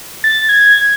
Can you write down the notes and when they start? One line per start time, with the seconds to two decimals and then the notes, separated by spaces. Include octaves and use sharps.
0.24 A6
0.49 G#6